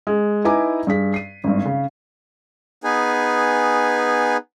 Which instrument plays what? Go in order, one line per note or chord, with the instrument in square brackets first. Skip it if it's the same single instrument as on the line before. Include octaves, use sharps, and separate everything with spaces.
[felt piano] G#3
D#4 E4 B4 G#5 A#5 D6
G2 G#4 B6
C7 D#7
G#1 G2
C#3
[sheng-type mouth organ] B3 D#4 G#4 B4 G#5